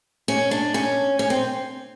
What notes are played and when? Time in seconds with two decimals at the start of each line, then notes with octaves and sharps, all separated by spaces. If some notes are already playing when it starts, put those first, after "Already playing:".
0.28 C#4
0.51 D4
0.74 C#4
1.19 C#4
1.30 C4